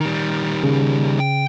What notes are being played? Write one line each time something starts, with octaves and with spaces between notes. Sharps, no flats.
D#3 G3
C#3
G5